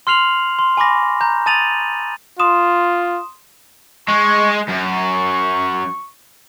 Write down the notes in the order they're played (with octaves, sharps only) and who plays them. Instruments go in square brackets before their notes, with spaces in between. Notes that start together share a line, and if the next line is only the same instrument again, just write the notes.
[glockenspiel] C6 F6 C7 F7 F#7
C6
G#5 B5 C#6 D6 A#6
A#5 G6
A5 D#6 A6 D#7 F7 F#7
[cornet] F4 [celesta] C6 D#6 E7
[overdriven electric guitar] G#3 [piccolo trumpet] C#6
[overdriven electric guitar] F#2 [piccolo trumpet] C#6